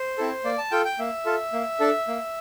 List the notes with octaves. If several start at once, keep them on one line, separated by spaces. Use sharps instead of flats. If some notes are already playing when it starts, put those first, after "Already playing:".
Already playing: C5
C4 E4 A4
A#3 D5
A5
F4 A4 G5
G5
A#3 E5
F4 A4
A#3
D4 A4
A#3